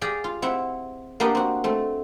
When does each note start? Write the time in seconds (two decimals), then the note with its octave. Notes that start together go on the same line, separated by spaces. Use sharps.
0.01 G4 G#4 D5 F5 G5
0.24 F4
0.42 C4 E4 E5 F#5
1.20 A#3 B3 D4 G4 A#4 D#5
1.35 C4 F#4
1.64 A3 C4